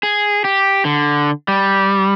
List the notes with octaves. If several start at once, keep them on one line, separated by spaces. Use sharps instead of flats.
G#4
G4
D3
G3